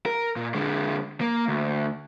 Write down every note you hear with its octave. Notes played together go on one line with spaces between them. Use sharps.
A#4
A#2
D3 G#3
A#3
D2